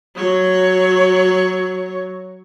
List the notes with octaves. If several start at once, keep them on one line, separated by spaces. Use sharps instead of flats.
F#3 C#5